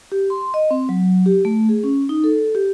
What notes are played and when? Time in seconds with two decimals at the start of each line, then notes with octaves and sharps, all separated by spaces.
0.12 G4
0.30 C6
0.54 D#5
0.71 C4
0.89 F#3
1.26 G4
1.45 A3
1.69 G#4
1.84 C#4
2.09 D#4
2.24 A4
2.55 G4